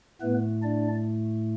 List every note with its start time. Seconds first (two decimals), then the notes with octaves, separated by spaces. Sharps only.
0.21 A2 A3 B3 B4
0.63 D4 D5